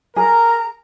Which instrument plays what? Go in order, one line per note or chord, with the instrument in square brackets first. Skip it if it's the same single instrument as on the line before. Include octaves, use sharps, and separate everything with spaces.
[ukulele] G#4 [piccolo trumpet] A#4 [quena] A#5